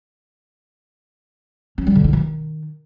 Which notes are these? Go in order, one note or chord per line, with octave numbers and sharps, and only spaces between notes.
C#4
G3
D3
E4
D#3